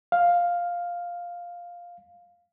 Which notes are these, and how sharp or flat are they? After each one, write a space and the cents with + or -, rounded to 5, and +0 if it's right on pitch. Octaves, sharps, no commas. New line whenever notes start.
F5 +5